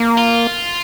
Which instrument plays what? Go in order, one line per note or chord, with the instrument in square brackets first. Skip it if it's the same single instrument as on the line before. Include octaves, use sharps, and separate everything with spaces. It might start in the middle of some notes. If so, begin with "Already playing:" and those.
Already playing: [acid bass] A#3
[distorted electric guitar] F4